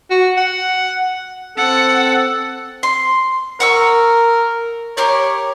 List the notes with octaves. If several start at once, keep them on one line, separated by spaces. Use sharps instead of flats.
F#4
F#5
C4 A4 F#5
C6
A#4 F#5 C#6 E6
G4 A#4 C#5 D5